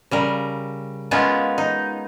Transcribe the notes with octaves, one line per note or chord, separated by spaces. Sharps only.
C#3 G3 A#4
G#3 B3 C#4 F4 A#4
D#4